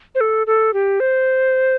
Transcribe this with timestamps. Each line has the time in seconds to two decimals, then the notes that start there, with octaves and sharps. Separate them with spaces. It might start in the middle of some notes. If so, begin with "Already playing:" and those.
0.15 C5
0.20 A4
0.47 A4
0.73 G4
1.00 C5